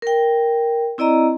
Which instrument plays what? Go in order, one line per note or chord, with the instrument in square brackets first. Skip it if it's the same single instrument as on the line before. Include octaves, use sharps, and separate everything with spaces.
[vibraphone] A#4 G5
C4 E4 D5 D#5 A#5